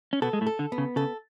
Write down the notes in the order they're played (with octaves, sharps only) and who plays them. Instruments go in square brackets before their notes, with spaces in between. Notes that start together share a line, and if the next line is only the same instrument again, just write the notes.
[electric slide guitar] C#4
[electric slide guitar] B2 B3 [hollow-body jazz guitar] A4
[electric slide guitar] G#3
A2 A3
[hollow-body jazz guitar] A4
[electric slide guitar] D3
[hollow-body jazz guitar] B3
[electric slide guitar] C#3
[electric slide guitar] C#3 [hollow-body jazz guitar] A4